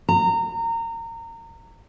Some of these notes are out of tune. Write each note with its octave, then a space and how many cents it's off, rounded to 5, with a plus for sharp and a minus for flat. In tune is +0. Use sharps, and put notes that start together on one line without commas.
A#5 -25